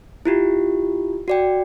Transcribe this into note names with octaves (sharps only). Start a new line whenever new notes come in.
E4 F4 G4
F#4 D5 G5